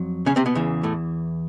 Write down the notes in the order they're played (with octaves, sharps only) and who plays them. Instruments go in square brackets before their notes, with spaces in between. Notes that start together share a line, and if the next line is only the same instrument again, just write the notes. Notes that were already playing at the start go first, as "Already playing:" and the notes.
Already playing: [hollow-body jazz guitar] F2 F#3
C#3 C#4
C3 C4
B2 B3
E2 C#3 E3
A2 A3